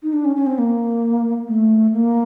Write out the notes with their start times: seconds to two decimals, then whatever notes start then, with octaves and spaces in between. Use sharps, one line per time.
0.03 D#4
0.13 D4
0.25 C#4
0.36 C#4
0.46 C4
0.58 A#3
1.47 A3
1.92 A#3